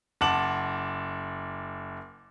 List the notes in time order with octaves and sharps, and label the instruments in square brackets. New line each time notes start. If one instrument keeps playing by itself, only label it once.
[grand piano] F#1 F#5 A5 D6 F#7